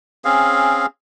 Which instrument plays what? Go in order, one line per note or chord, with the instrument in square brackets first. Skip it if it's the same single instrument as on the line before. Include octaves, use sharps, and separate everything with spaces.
[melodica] C4 C#4 G#4 F5